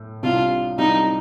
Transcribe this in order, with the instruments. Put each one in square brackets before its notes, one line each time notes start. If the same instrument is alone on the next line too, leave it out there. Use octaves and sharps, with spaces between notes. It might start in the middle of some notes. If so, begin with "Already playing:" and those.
Already playing: [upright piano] A2
[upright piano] C2 C3 G3 D4 [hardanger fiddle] F4
[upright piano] C2 C3 G3 D4 [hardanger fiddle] D#4